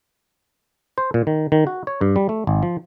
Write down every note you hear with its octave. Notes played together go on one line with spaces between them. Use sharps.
C5
A#2
D#3
D#3
F#4
C#5
G2
G3
A3
G#1
F3